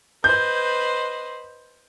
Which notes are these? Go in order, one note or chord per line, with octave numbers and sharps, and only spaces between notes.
B4 C5 D#5 G6